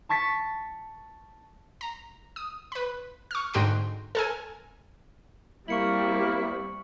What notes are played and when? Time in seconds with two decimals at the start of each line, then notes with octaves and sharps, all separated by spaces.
0.09 A5 C#6 A6 B6 C#7
1.81 A#5
2.36 D#6
2.72 B4 B5
3.31 C#6 F6
3.54 G#2 D3 F#4 G5 A#5 C6
4.15 A4 A#4 G#5
5.68 G3 A#3 C4 E4 C#6 C#7 F#7